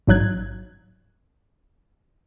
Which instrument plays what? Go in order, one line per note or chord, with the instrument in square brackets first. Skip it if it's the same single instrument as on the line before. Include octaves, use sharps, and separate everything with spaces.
[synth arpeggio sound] A1 G#2 F#3 F#6 G#6